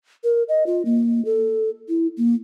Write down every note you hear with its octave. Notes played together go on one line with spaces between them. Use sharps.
A#4
D#5
F4
A#3
A4
E4
A#3